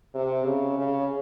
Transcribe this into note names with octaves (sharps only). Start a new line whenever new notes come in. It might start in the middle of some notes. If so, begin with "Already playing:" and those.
C3
C#3
C#3